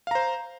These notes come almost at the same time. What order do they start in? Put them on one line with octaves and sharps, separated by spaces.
F5 A#5 C5